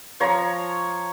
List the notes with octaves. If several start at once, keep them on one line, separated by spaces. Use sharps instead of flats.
F3 C#5 A#5